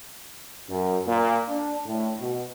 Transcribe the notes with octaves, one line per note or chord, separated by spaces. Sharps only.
F#2
A#2
D4
A2
B2